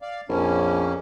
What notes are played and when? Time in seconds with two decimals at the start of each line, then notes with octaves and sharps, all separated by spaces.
0.02 D5 F5
0.29 A#1 F2 A#3 C#4